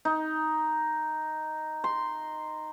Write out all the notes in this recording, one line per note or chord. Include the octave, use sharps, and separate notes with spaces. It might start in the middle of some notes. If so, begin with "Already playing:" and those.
D#4
C6